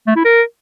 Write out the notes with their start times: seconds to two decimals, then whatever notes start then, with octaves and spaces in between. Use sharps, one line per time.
0.07 A3
0.16 E4
0.25 A#4